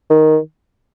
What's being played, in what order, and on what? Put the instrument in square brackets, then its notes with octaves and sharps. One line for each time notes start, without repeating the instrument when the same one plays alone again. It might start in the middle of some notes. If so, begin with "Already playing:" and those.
[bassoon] D#3